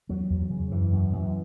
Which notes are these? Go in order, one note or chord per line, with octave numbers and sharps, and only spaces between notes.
E2 F#3
E2
C#3
F#2 E3
F#2
F#2